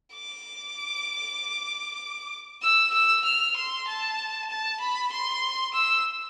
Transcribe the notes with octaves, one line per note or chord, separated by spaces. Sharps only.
D6
E6
E6
F6
C6
A5
A5
B5
C6
E6